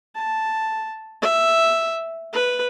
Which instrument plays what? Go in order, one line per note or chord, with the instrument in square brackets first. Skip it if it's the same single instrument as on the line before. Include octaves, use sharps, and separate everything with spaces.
[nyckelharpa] A5
E5
B4